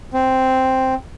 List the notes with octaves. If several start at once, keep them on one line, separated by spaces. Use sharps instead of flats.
C4